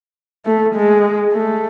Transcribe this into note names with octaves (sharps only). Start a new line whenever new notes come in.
A3
G#3
A3